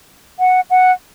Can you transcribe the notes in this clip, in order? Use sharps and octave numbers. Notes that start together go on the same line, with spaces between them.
F#5
F#5